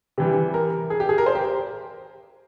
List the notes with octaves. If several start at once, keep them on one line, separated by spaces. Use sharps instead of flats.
C3 E3 G3 G4
A#4
G#4
G4
G#4
A#4
C5
G4